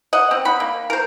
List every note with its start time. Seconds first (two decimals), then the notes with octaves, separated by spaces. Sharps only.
0.13 D#5 F#5
0.31 C4
0.45 F#5 B5
0.60 A#3
0.90 A#4 C5